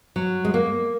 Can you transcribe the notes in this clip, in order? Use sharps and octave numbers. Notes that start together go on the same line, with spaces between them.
F#3
G#3
A#3